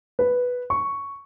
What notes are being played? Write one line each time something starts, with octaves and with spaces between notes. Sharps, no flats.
B4
C#6